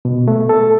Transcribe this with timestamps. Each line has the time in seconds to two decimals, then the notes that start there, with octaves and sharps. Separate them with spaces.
0.05 B2
0.28 A3
0.49 A4